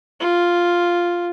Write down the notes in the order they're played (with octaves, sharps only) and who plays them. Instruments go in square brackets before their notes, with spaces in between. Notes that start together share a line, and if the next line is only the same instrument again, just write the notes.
[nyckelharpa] F4